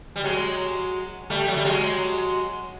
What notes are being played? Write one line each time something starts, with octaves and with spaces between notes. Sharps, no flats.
G3
F#3 G#3
G3 A3
F#3
G3
F#3 G#3